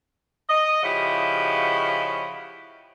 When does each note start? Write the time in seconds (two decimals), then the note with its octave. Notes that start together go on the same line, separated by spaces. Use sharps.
0.49 D#5
0.83 C#3 F3 E4 F#4 G4 D#5